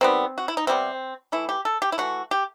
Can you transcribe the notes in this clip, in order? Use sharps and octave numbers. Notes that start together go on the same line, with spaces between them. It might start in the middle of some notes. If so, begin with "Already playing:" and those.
D#3 G3 B3 C4
F#4
E4
D#4
C3 E3 G3 B3 C4
E3 A3 E4
G4
A4
G4
E4
E3 A3 F#4
G4